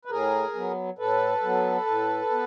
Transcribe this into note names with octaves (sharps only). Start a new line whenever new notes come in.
B4
A2 G#4 A#4
F#3 B3
A2 A4 B4
F#3 B3
A2
B3